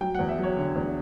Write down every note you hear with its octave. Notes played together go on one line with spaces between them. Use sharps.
F#3 G5
E2 F#5
E5
F#3
C#5
D3
E2